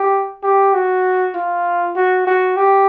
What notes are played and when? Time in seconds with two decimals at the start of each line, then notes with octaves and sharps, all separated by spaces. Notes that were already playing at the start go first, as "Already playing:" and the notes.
Already playing: G4
0.43 G4
0.74 F#4
1.35 F4
1.96 F#4
2.27 F#4
2.57 G4